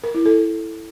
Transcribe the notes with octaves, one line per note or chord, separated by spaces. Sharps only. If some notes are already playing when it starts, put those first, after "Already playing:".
A#4
E4
A4